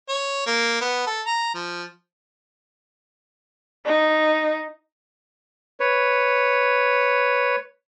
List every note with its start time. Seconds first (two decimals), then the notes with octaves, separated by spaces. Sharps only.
0.09 C#5
0.47 A#3
0.81 B3
1.07 A4
1.27 A#5
1.55 F3
3.86 D#4
5.80 B4 C#5